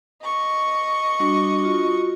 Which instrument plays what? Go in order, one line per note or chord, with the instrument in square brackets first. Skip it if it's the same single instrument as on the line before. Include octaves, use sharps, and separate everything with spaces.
[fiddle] D#5 C#6
[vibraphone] G3 D4 F#4
F4 F#4